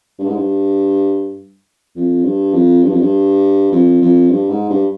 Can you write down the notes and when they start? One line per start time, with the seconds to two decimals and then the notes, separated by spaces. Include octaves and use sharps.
0.19 G2
0.27 G#2
0.36 G2
1.95 F2
2.24 G2
2.54 F2
2.84 G2
2.92 F2
3.01 G2
3.72 F2
4.01 F2
4.31 G2
4.50 G#2
4.70 G2